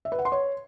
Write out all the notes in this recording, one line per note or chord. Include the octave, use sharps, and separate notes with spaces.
E5
B4
F#5
C6
C#5